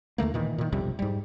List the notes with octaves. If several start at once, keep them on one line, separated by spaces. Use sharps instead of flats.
D#2 D3 A3 A#3
A#2 D#3 E3
A#2 D#3
B1 F2 C3 G3
G#2 G3